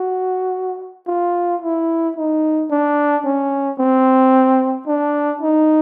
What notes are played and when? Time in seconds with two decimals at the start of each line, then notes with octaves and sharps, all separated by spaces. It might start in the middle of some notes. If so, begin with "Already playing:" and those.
Already playing: F#4
1.07 F4
1.62 E4
2.17 D#4
2.71 D4
3.25 C#4
3.79 C4
4.87 D4
5.41 D#4